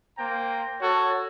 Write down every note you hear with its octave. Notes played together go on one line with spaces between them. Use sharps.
A#3 C5 G5 A#5
F#4 A4 C#5